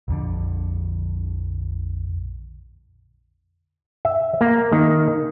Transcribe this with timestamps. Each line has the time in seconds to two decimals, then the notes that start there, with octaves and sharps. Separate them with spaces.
0.08 A#1 F2 D3
4.05 E5
4.41 A#3
4.72 D#3